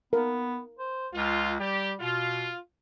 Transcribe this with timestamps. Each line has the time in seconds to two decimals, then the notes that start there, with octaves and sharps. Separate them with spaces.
0.13 B3 A#4
0.79 C5
1.13 C#2 F4
1.60 G3 G4
2.00 B2 F4